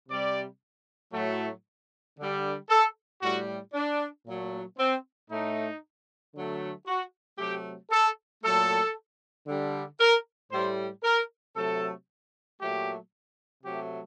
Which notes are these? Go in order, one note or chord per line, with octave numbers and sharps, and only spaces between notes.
C3 G3 D5
A2 F#3 A3
D3 G3
A4
A2 G3 F#4
D4
A#2 F#3 A3
C4
A2 A3 D#4
D3 F#3 A3
F#4
C3 F#3 A3 G4
A4
A#2 F#3 A3 A4
D3 G3
A#4
A2 G3 C5
A#4
C3 F#3 A3 A4
A#2 F#3 A3 G4
C3 F#3 A3 G4